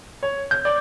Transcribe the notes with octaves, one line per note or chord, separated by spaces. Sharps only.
C#5
G6
D5